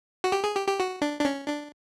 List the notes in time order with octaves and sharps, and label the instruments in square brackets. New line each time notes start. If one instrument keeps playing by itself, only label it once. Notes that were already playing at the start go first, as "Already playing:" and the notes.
[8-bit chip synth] F#4
G4
G#4
G4
G4
F#4
D4
D4
C#4
D4